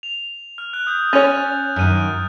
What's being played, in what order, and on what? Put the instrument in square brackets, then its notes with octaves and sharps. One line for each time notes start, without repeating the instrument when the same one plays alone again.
[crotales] F7
F6
F#6
D#6 G6
[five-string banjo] C#4 C#5 [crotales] A6 D#7
[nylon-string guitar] F#2 D#3 [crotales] F6 D#7